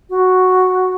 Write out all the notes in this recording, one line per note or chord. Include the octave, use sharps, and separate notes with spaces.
F#4